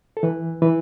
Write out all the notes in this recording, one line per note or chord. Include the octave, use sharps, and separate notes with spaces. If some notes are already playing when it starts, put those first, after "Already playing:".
A4
E3 B4
E3 B4